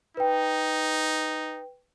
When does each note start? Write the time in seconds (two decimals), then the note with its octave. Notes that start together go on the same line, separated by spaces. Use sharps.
0.17 D#4 B4 G5